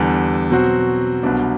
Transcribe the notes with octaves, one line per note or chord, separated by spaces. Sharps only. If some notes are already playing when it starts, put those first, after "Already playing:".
Already playing: E2 D3 G3
B2 F#3 C4 F#4 C5
C2 B2 F#3 B3 D4